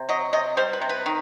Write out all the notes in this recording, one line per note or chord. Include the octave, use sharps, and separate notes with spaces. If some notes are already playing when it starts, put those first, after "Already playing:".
Already playing: C3
F#3 D#5
C3 D#5
G3 C5
B4
C3
B4
D#3